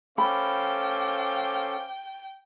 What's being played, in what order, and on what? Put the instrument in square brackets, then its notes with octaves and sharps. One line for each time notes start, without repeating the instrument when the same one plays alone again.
[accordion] C#4 A4 [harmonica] C5 F5 D6 [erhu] G5 [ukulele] B5